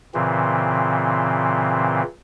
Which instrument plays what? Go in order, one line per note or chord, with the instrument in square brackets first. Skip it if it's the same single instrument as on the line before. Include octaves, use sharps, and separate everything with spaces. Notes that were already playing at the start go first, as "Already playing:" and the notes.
[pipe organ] A#2 C#3 E3 C4